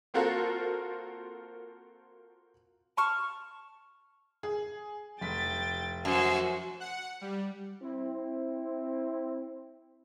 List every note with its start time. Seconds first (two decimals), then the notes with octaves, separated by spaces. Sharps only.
0.14 A#3 C4 F4 F#4 A4 A#4
2.97 A5 C#6 F6
4.43 G#4
5.21 F1 G5 A6 B6
6.05 F#2 F#4 C5
6.80 F#5
7.21 G3
7.81 C4 E4